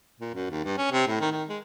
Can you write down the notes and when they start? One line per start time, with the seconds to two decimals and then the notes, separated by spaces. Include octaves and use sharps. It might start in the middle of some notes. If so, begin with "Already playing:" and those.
0.20 A#2
0.34 F#2
0.51 D#2
0.65 G2
0.77 C#4
0.91 C3
1.07 A2
1.21 D#3
1.32 D#3
1.49 G#3